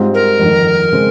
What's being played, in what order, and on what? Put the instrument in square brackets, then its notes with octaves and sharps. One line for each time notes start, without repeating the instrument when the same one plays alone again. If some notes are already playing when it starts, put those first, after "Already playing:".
Already playing: [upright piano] G#2 G3 C4 F4
[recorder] A#4
[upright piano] G1 F2 D#3
C#3 G#3 C4